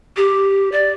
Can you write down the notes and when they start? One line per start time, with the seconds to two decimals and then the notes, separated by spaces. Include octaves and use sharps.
0.17 G4
0.72 D5